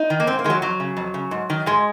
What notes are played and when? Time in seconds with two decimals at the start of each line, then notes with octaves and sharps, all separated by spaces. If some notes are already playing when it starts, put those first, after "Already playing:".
Already playing: D#4
0.10 D#3
0.20 A#3
0.27 G#2 C4
0.39 A#3
0.44 D#3 G#3
0.50 F#3
0.62 F2 F#3
0.80 C#3
0.97 F2
1.14 C#3
1.31 G#2
1.50 D#3
1.66 G#2 G#3